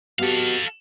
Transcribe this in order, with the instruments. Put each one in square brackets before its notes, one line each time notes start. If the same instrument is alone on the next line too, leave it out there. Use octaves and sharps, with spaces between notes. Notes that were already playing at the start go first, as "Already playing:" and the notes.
[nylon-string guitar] B3 G4 D#5 [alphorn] F#4 [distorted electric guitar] A4 F5